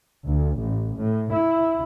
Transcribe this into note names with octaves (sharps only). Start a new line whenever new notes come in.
D2
A1
A2
E4